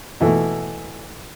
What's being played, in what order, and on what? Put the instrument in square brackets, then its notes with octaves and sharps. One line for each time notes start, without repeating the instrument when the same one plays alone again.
[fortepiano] B2 E3 A3